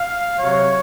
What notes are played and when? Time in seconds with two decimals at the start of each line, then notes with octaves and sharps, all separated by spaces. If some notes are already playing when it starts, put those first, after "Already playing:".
Already playing: F5
0.38 C3 F#3 C#5